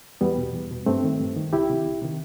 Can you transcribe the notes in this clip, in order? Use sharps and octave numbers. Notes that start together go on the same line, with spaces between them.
E2 G3 B3
B2
E2
B2
G2 A3 C4
D#3
G2
D#3
C2 E4 G4
C3 D#3
C2
C3 D#3